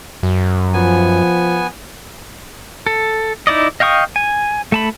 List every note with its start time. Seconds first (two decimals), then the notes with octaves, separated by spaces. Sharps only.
0.23 F#2
0.74 F3 B3 G#5
2.86 A4
3.47 D#4 E4 D5 D#5
3.80 D#5 F5 G5 C#6 D#6
4.16 G#5
4.72 A3 A5 B5